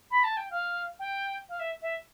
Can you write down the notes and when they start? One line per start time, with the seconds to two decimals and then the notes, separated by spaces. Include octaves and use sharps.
0.11 B5
0.24 A5
0.37 G5
0.51 F5
0.99 G5
1.49 F5
1.59 E5
1.82 E5